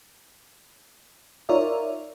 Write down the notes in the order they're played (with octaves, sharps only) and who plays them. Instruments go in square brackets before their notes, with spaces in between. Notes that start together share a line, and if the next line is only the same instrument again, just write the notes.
[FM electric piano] D#4 F4 A#4 C#5 D5 E5